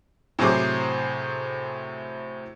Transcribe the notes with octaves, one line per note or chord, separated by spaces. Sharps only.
A2 C3 F#3 G#4 C5 D6